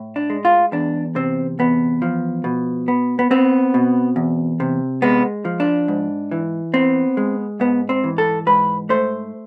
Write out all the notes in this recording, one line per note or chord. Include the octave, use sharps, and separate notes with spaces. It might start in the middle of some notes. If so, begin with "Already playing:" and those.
Already playing: A2
D4
G#3
F4
E2 D4
C3 C4
E2 B3
F3
B2
B3
B3
B3 C4
B2
E2
C3
G#3 B3
F3
D4
G#2
E3
B3 C4
G#3
G#2 B3
C4
E3
A4
G#2 B4
A3 C5